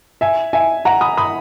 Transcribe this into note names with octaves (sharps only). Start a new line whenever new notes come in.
E5 G#5
E5 G#5
F#5 A#5
B5 D#6
B5 D#6